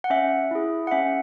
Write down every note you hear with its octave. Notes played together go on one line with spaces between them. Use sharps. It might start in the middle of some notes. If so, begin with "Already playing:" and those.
F#5
C#4 E5
E4 G#4
F#5
C#4 E5